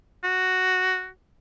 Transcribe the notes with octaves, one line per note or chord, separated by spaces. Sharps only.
F#4